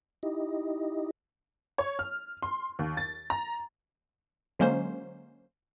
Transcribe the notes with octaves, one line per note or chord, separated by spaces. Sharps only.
D#4 E4 G4 D#5
C#5
F6
C6
D#2
A6
A#5
D3 F#3 G#3 A#3 C#4 C5